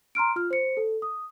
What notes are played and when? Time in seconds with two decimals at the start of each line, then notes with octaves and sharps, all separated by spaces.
0.15 A#5 C6 F6 D7
0.36 F4 F6
0.51 C5 C#7
0.77 A4
1.02 D#6